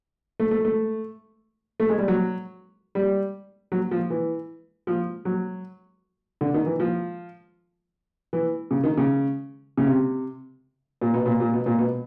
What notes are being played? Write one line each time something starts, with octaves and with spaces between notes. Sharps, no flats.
A3
A3
A3
A3
G#3
G3
F#3
G3
F#3
F3
E3
F3
F#3
D3
D#3
E3
F3
E3
C#3
D#3
C#3
C#3
C3
A#2
B2
A#2
A#2
B2
A#2
B2